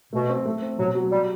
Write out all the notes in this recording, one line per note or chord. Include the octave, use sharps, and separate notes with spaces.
B2 A3
C4
A3
C4
B2 F#3
F#3
G3 G4